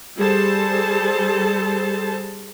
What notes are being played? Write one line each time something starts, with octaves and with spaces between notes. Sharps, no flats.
G3 G#4 A4 C5 A5